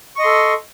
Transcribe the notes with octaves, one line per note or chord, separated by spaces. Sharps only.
A4 D#5 C6 C#6